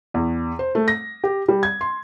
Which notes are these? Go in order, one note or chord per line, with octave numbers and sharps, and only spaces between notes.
E2
C5
A3
A#6
G4
G3
G#6
C6